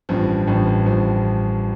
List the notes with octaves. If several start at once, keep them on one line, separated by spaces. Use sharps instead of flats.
A1 G2 F3
A1 G2 F3
A1 G2 F3